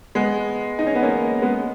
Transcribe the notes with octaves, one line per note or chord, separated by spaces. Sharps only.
G#3 B3
D#4
C#4
B3
A#3 C#4
G#3 B3